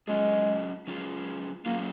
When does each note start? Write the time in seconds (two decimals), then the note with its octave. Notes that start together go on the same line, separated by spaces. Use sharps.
0.08 F#3 G#3 C#4 F4 G#4
0.87 F#3 C#4 F4 G#4
1.66 F#3 A#3 C#4 F4 G#4